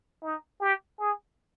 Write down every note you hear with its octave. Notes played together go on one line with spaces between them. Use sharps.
D#4
G4
G#4